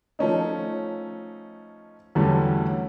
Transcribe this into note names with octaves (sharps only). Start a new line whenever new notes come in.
F3 A3 C#4 D#4
E2 D3 F#3 G3 A3 C#4